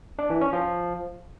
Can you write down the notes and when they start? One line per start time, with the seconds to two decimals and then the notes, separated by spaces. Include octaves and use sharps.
0.19 D4
0.30 E3
0.41 C#4
0.53 F3